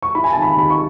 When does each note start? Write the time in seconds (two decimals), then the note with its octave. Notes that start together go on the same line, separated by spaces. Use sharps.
0.02 C#6
0.15 E4 B5
0.24 G#5
0.33 D#3 A5
0.42 B5
0.56 D#2 B5
0.70 C#6